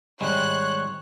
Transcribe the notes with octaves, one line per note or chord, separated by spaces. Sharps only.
G#1 G3 G#3 C5 C#5 F#6